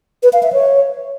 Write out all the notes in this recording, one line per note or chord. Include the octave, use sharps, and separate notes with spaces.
B4
F5
E5
C#5